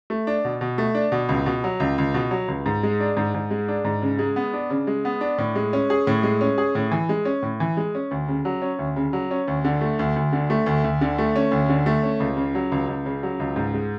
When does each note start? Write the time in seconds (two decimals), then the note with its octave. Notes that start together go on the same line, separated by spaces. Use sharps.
0.10 A3
0.27 D4
0.45 B2
0.61 B2
0.78 A3
0.95 D4
1.12 B2
1.29 C#2
1.46 B2
1.64 F#3
1.80 C#2
1.98 C#2
2.14 B2
2.31 F#3
2.48 C#2
2.66 G#2
2.83 G#3
3.00 D4
3.17 G#2
3.34 G#2
3.51 G#3
3.68 D4
3.85 G#2
4.02 C#3
4.19 G#3
4.36 B3
4.53 D4
4.70 C#3
4.87 G#3
5.05 B3
5.21 D4
5.38 A2
5.55 G#3
5.73 C#4
5.90 G#4
6.07 A2
6.23 G#3
6.41 C#4
6.58 G#4
6.75 A2
6.91 E3
7.09 G#3
7.25 C#4
7.43 A2
7.60 E3
7.77 G#3
7.95 C#4
8.11 D2
8.28 C#3
8.45 F#3
8.62 C#4
8.79 D2
8.96 C#3
9.13 F#3
9.31 C#4
9.48 D2
9.64 D3
9.81 A3
9.99 D2
10.16 D2
10.32 D3
10.50 A3
10.66 D2
10.84 D2
11.01 D3
11.18 A3
11.36 C#4
11.51 D2
11.69 D3
11.86 A3
12.03 C#4
12.20 C#2
12.37 C#3
12.55 F#3
12.72 C#2
12.88 C#2
13.06 C#3
13.23 F#3
13.40 C#2
13.56 G#2
13.74 G#3